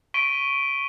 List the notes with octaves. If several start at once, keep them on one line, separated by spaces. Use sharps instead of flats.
C#6 B6 D7 D#7 G7